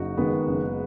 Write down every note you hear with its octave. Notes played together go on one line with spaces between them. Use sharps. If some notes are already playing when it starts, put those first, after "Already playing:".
Already playing: F#1 D#4 F#4
D#3 G#3 B3
F#1